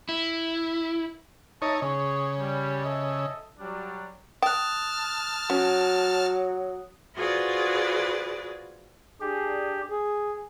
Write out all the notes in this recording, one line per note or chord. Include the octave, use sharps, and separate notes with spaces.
E4
D#4 C#5 E5 A5
C#3 G#4 C#5
G3
A4 D#5 E5
F#3 G3 D4
G5 A5 D#6 F6 F#6
F#3 C#4
F4 F#4 G#4 B4 C5 D5
D4 G4 G#4
G#4